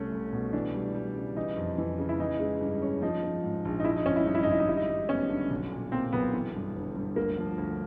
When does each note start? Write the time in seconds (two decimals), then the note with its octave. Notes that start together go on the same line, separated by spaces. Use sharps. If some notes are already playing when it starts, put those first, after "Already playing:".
Already playing: C2 A3 C#4
0.12 C2
0.32 B2
0.53 E3 D4
0.75 G3
0.94 G3
1.16 C#3
1.36 E3 D#4
1.57 F2
1.78 E3
1.98 C#3
2.09 E4
2.19 E3 D#4
2.39 G#3
2.61 G2
2.82 C#4
3.02 F3 D#4
3.23 F3
3.43 G#2
3.65 A#1
3.80 D#4
3.84 F3 E4
3.96 D#4
4.06 G#1 C#4
4.16 E4
4.27 G2 D#4
4.35 E4
4.43 D#4
4.47 G#1 E4
4.60 D#4
4.68 G3 E4
4.77 D#4
4.89 G3
5.09 B3 C#4
5.29 D3
5.50 B1
5.72 A#2
5.92 A#3 C4
6.13 B1 B3
6.33 E3
6.55 G2
6.75 G1
6.96 G2
7.16 D2 A#3
7.37 F3
7.58 D2